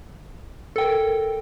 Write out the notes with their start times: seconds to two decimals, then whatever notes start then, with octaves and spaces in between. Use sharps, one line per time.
0.76 A4
0.78 G5
0.81 A#4